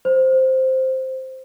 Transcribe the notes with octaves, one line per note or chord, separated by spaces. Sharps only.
C5